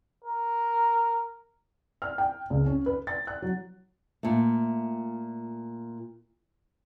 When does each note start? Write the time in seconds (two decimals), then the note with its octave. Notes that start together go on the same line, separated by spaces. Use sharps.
0.24 A#4
2.02 F6
2.18 G5
2.50 C#2
2.66 C#4
2.86 B4
3.07 A6
3.27 F#6
3.42 F#3
4.23 A#2 A3